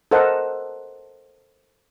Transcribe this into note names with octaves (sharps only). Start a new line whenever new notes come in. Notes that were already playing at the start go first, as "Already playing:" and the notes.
A4 A#4 C5 D#5 F#5